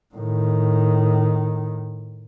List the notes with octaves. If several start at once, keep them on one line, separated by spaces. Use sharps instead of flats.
A2 D#3